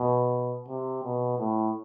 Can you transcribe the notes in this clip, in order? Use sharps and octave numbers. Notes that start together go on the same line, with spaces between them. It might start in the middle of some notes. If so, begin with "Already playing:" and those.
Already playing: B2
C3
B2
A2